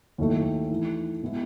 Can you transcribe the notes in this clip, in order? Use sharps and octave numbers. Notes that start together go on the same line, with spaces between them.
D#2 D#3 F#3 A3 E4
E3 A3 D#4
B2 G#3 B3 E4